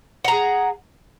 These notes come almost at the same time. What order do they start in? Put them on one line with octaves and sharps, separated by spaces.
F#5 A#5 G#4